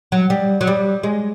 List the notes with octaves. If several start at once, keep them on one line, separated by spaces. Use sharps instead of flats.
F#3
G3
F#3
G3
G#3